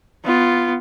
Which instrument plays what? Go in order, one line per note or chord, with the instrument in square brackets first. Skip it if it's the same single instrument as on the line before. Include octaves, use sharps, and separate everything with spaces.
[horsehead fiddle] B3 F4